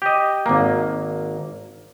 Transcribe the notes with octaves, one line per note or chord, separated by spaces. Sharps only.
G4 D#5
G#1 A#3